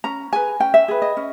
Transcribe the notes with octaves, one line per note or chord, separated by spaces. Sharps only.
C#4 A#5
G#4 B4 G#5
C#4 G5
E5
G#4 B4
D#5
C#4